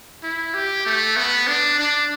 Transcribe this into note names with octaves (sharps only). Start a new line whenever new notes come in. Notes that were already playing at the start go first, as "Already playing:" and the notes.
E4
G4
A3
B3
D4
D4